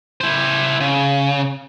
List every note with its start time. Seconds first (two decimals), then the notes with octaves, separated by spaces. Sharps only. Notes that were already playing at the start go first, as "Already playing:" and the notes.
0.21 E4 C5
0.80 C#3